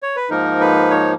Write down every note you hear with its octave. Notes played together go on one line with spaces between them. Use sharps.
C#5
B4
G#2 F3 A#3 D#4 A#4
B4
C#5